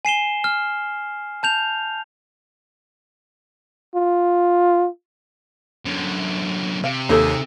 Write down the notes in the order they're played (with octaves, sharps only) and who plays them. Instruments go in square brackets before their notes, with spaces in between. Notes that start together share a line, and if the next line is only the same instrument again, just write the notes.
[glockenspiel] G#5 C7 E7 G7
F6
A5 G6 F7
[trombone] F4
[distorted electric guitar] F#2 D3
[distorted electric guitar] C3 [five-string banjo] F5
[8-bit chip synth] D#2 [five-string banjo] D#4 G#4 A4